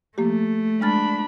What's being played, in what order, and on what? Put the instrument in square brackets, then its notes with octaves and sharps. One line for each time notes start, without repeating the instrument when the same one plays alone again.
[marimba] F3 A#3 G4 [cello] A3
[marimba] G#3 F6 A6 [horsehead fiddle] D4 B5